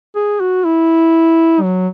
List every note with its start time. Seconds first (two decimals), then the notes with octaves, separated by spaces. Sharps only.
0.15 G#4
0.40 F#4
0.64 E4
1.62 F#3